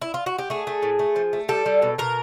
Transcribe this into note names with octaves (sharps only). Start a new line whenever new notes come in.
E4
F4
F#4
G4
A3 G#4
A3
A2
A3
F3
A3
G3 A4
G3
B2
B2 A#4